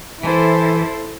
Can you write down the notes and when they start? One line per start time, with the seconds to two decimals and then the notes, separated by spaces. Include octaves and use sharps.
0.23 E3 E4 A4 C5